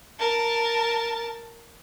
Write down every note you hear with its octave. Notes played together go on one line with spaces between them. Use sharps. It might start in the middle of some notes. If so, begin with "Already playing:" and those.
A#4 A5